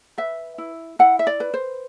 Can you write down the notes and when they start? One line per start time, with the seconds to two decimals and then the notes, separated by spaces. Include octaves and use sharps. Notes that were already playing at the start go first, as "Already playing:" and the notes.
0.18 B4 E5
0.58 E4
0.99 E4 F#5
1.19 E5
1.27 D5
1.40 B4
1.54 C5